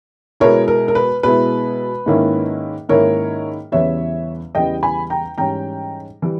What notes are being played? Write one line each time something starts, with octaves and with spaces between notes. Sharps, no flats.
B2 G#3 B3 E4 A#4 C#5
A#4
A#4
B4
B2 G#3 B3 E4 B4
G#2 D#3 A#3 C#4 E4
G#2 D#3 A#3 C#4 E4 A#4 C#5
E2 C#3 E3 G3 B3 C#5 E5
E2 C#3 E3 G3 B3 D#5 G5
G#5 B5
G5 A#5
G#2 E3 G3 C#4 G5 A#5
E3 G3